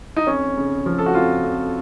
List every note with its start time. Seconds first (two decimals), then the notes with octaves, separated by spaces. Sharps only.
0.16 D#4
0.27 F2 C#4
0.57 C#3
0.86 F3
0.99 A4
1.06 F#4
1.15 F2 F4
1.44 F2